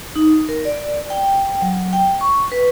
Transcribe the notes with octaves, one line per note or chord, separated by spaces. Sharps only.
D#4
A#4
D5
G5
F#3
G5
C#6
B4